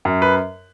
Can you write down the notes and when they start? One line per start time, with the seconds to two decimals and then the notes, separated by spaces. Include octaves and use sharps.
0.05 F#2
0.22 B4